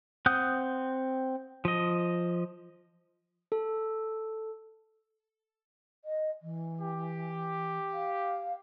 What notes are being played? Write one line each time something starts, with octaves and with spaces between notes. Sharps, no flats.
C4 F#5 D#6 F#6 G6
F3 D#5
A4
D#5
E3
G4
F5